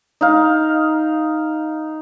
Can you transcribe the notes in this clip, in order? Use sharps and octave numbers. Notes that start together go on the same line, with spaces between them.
D#4 F5